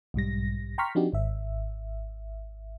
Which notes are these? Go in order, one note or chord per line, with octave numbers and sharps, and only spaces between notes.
B1 G#2 G3 A#6
G5 A#5 C6 C#6 F6 B6
F3 C4 D4 D#4 F#4 G4
G#1 E5